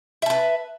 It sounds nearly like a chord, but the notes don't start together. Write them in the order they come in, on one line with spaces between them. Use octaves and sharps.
E5 A5 B4